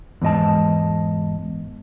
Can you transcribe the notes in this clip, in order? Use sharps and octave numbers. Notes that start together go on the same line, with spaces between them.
E2 G#2 D#5 A5